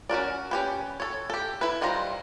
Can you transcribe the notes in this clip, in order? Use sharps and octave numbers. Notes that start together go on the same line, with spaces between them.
C#4 F#4 A#4 D5
C#4 G4 B4
A4 C#5
G4 A4
E4 B4
D#3 G3 F4 C5 A#5